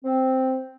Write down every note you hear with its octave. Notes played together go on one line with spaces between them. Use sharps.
C4